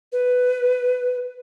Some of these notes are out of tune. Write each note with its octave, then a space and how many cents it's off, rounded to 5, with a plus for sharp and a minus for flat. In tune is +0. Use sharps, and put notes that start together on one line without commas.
B4 +10